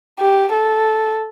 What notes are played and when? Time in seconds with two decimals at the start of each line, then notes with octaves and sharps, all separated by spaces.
0.19 G4
0.53 A4